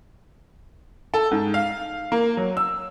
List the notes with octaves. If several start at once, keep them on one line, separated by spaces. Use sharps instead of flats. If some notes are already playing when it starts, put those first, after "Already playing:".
A4
G#2
F5
A#3
F#3
E6